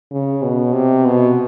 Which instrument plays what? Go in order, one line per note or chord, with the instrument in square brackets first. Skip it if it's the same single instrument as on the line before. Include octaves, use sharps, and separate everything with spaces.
[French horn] C#3
B2
C3
B2